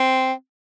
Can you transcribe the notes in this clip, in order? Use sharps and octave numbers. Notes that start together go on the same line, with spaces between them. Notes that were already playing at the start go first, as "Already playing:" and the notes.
Already playing: C4